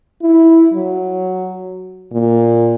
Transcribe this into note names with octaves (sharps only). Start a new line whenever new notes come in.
E4
F#3
A#2